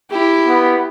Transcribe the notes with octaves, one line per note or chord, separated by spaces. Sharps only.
E4 G4
B3